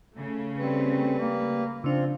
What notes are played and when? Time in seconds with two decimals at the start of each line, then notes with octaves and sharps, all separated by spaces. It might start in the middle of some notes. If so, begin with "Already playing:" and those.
0.15 C#3 A3
0.58 G3 C4 B4
1.19 A#3
1.84 C#3 F3 C4 D4 F4